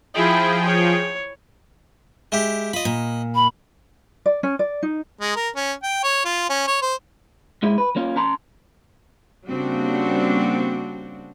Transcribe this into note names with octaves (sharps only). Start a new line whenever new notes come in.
F3 E4 G#4 G5
C#5
G#3 E4 G4
F4 D#5 B5
A#2
B5
D5
C#4
D5
D#4
G#3
A#4
C#4
G5
C#5
F4
C#4
C#5
C5
G#2 G#3 E4
B4
A#3 C#4 F4
C#4 A5 A#5 C6
C#3 G3 A#3 C4 D4 F#4